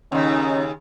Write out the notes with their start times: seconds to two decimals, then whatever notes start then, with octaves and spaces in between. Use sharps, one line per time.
0.12 D#2 C#3 C#4 D#4